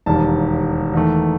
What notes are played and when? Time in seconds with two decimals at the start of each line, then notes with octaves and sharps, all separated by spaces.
0.06 E1 D#2 D#3 G3 A5
0.93 E2 D#3 A3